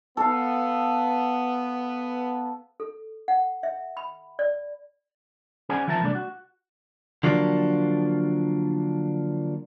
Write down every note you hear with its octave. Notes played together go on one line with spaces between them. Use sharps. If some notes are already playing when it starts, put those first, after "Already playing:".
B3 A4 F5
A4
F#5
E5
B5
D5
C#4 G#4 C5 D5 F#5 G#5
E3 F3 E4 A#4 A5
C2 A3 D4 D5
F#4
D3 F3 F#3 A#3 D4